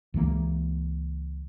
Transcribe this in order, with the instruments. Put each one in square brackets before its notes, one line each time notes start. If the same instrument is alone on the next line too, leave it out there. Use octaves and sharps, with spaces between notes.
[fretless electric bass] C#2 E3 A#3